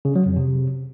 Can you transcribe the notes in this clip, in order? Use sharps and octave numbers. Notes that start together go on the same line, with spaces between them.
C#3
F#3
F2
C3